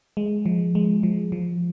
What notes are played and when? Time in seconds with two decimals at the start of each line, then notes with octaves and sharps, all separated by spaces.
0.17 G#3
0.46 F3
0.75 G#3
1.03 F3
1.32 F3